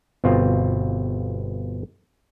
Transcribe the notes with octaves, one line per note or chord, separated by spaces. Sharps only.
G1 B2 C4 F4